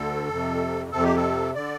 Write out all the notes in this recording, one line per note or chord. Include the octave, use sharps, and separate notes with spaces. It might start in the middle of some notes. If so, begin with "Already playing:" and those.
Already playing: D2 D3 A4
F2 C3
F2 C3 A4
G4
A4
D3 D5